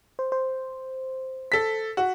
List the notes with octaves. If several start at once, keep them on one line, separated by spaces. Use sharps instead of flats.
C5
C5
A4 B6
F#4